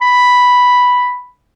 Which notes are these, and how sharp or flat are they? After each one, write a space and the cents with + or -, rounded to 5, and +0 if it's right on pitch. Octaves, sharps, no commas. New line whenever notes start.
B5 +0